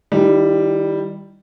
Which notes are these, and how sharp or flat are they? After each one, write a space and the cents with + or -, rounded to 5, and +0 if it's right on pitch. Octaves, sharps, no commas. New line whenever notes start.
D#3 +0 G3 +0 E4 +25